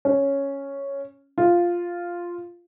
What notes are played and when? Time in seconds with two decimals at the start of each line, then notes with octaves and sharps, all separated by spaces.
0.05 C#4
1.38 F4